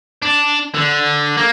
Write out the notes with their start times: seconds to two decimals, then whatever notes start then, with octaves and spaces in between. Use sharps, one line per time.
0.22 D4
0.74 D3
1.37 A#3